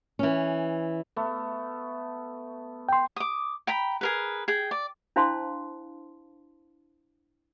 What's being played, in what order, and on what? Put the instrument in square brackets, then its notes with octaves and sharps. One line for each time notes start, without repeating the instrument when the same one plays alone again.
[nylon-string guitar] E3 C#4
[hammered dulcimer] A3 B3
[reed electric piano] G5 C6
[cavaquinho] D6 D#6
G5 A#5 B5
G#4 A#4 B4
G#4 G5
D5
[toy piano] D4 E4 C5 F5 A5 C6